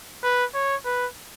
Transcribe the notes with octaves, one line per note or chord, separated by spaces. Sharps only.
B4
C#5
B4